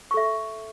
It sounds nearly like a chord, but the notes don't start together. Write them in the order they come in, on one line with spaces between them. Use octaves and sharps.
C#6 A4 E5